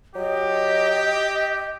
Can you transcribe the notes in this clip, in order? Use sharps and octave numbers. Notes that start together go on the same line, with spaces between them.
F#3 G4 D#5